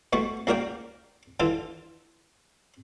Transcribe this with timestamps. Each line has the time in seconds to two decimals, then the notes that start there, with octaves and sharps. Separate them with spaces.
0.13 B2 A3 F#4 C#6
0.47 C#2 A#3 F#4 A#4 D5 G5
1.40 D3 E3 F4 A4